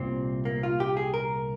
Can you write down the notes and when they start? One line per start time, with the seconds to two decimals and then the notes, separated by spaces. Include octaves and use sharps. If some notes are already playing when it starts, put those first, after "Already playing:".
Already playing: C2 A#2 C4
0.45 A#3
0.63 F4
0.80 G4
0.97 G#4
1.14 A#4